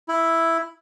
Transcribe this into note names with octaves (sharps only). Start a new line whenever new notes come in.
E4